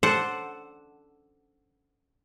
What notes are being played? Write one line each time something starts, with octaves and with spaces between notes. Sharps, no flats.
A4 C5 D5 F#5